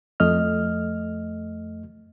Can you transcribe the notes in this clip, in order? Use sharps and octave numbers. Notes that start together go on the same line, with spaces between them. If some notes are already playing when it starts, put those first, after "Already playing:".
F2 A3 D#5 F6